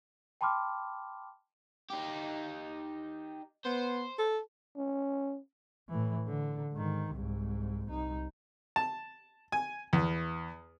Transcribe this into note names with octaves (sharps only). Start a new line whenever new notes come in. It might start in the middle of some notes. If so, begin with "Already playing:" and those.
G5 A5 B5 C6 D6 F6
D#4 G4
B3 C5
A4
C#4
A2 E3
D3
G#2 D#3
C2 G#2
C2 D#4
A5
G#5
E2